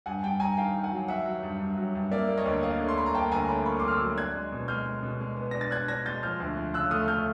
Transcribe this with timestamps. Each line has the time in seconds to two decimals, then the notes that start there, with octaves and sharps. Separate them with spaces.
0.06 G2 F#5 G#5
0.23 G2 G5 A5
0.40 G2 G#5 A#5
0.57 D#3 F5 G5
0.74 D#3
0.84 F#5 G#5
0.92 F#3
1.08 F#3 E5 F#5
1.26 F#3
1.43 G2
1.60 G2
1.77 F#3
1.95 G2
2.11 A#3 D5 E5
2.29 A#3
2.38 C#5 D#5
2.45 D2
2.63 A#3 D#5 F5
2.80 D3
2.89 C6
2.98 A#3 B5
3.06 A#5
3.15 A#3 G5 A5
3.32 D2 G#5 A#5
3.48 D3 A5 B5
3.65 A#3 B5 C#6
3.79 C6 D6
3.83 D3
3.88 F6
3.91 D6 E6
4.00 F#3
4.17 D4 F#6 G#6
4.35 G#3
4.52 B2
4.68 G#3 F6 G6
4.86 G#3
5.03 B2
5.21 G#3
5.37 B3
5.51 D4 A#6
5.61 A6
5.71 D4 F#6 G#6
5.88 D4 G#6 A#6
6.06 G#3 G6 A6
6.23 F3 F6 G6
6.40 D2
6.57 F3
6.74 C#3 E6 F#6
6.91 A3 D#6 F6
7.08 A3 F6 G6